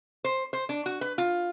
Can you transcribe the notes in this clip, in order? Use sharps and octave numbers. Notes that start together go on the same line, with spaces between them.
C5
C5
D4
F#4
B4
F4